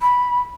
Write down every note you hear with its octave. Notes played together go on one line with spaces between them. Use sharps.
B5